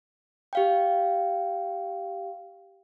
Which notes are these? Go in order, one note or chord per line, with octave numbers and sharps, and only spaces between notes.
G4 F5 G5